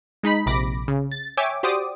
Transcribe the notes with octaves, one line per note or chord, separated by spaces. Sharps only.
G#3 D#4 B5 B6
A#1 C3 B5 D6 A#6
C#3
A6
C#5 E5 G5 G#5 D6
F#4 G4 C5 D5 D6 D#6